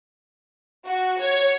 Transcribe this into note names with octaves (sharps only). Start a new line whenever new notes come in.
F#4
C#5